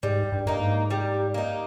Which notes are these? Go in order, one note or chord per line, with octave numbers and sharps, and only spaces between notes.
G#2 G3
G2
G2 A#3 D#4
G#2
G3
A#3 D#4